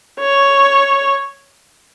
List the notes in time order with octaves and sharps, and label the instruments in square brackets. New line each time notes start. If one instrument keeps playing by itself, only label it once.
[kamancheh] C#5